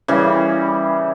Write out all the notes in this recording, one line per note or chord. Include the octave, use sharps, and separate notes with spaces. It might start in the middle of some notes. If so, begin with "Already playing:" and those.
C#3 E3 G3